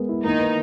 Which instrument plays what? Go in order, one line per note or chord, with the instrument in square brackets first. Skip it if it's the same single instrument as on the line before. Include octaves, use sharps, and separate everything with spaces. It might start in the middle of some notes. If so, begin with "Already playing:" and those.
Already playing: [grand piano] G#3 B3 A#4
E4
[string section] D#3 D#4 [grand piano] A#3
[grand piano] B4